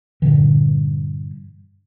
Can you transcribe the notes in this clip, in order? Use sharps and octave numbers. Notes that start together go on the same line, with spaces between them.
G2 A#2 D3 E3